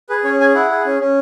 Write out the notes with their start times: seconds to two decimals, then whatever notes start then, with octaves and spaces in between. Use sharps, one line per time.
0.09 G#4 B4
0.24 C#4 C#5
0.40 G#4 G#5
0.54 E4 F#5
0.70 G#4
0.86 C#4
1.00 C#4